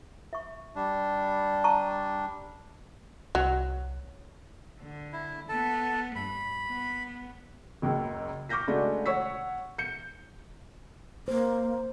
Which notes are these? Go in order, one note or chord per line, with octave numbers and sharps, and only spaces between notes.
E5 C#6
G3 D4
A5 A#5 C#6
C2 F#3
D3
E4
B3 A4 A5
G2 B5
B3
F#1 C#2 F#2
C#6 D6 F6 G6 A#6 B6
C#3 G#3 A3 D4 F#4
C#5 F#5 C#6 E6 B6
G6 C#7
A#3 C5